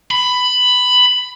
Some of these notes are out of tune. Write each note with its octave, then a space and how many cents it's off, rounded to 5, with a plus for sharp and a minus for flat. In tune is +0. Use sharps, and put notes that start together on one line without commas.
B5 +10